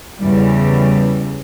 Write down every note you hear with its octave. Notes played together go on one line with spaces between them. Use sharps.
E2 C#3 E3 G3